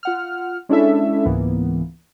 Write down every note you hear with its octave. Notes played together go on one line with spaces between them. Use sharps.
F4 F#5 F6
G#3 C#4 D4 E4 A4 E5
C#2 G#2 E3 A#3 B3